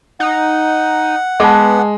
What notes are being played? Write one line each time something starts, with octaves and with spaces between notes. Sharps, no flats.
D#4 F#5
G#3 B3 A5 D6